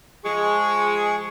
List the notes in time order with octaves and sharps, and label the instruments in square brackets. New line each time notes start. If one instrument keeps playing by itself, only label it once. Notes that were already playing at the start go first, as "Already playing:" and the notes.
[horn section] F3 G#3 [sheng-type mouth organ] G#4 C#6